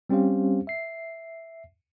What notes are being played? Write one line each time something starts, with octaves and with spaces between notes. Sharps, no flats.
G3 C4 C#4 G4 C5 F5
E5 C7